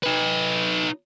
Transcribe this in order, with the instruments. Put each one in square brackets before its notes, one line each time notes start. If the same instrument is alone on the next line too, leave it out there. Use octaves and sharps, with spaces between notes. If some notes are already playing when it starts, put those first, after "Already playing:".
[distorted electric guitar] D#4 B4